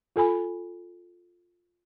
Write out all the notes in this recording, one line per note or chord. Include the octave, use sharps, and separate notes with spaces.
F4 A4 G#5 B5